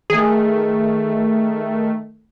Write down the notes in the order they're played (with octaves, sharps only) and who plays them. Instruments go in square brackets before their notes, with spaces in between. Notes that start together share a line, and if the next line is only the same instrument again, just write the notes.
[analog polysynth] D#3 A3 [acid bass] G#4